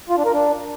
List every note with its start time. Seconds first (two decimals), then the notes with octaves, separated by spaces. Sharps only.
0.09 F4
0.17 D4
0.25 A#4
0.33 D4